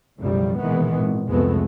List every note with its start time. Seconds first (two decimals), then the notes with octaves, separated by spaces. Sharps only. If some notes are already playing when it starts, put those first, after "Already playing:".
0.18 B1 F#2 A2 C#3 F3 G3
0.58 A#2 D#3 E3 G#3 B3
0.94 G#1
1.29 C2 F2 G#3 A3 B3